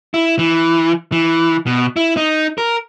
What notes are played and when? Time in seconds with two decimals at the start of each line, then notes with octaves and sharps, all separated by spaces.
0.14 E4
0.39 E3
1.12 E3
1.67 B2
1.96 E4
2.17 D#4
2.58 A#4